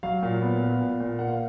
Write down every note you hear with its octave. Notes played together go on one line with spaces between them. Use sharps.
F#3 F5
A#2
B3
A#2
A#2
A#2
A#3 F#5
F5